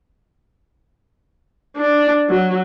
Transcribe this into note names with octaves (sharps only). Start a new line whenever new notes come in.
D4
F#3